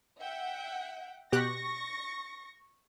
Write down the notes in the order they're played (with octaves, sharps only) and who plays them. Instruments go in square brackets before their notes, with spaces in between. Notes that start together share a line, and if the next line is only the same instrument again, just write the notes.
[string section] E5 F#5 G5
[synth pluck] B2 G4 F#6 [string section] C#6 A#6